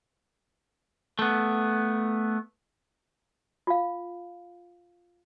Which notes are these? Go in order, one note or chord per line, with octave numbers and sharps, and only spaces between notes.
A3 B3
F4 F5